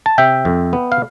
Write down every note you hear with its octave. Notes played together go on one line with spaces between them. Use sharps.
A5
C3 E5 G5
F2
B3
F5